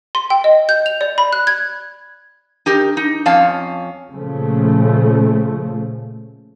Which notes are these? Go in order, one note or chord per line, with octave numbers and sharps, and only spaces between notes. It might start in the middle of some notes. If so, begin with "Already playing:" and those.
C6
G5
D#5
G6
F7
D5
B5
F#6
G#6
D#4 G4 A#4
D#4
F2 C#4 F5 A5
A#2 C#3 F3 A3